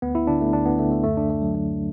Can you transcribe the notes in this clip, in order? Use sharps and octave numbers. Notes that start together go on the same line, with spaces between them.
D2 B3
E4
D3 D4
A3
D2 D4
B3
D3 A3
A3
F#2 A3
D4
D3 A3
F#3
D3 A3